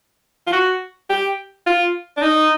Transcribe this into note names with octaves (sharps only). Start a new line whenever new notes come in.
F4
F#4
G4
F4
D4
D#4